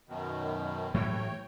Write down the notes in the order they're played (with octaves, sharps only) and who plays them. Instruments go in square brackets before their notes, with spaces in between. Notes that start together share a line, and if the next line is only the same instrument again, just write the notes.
[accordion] F#2 B2 D#3
[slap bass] A2 E3 F#3 [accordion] C#5 G5